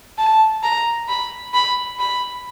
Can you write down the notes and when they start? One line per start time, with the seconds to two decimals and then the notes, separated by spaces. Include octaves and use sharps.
0.18 A5
0.63 A#5
1.08 B5
1.54 B5
1.99 B5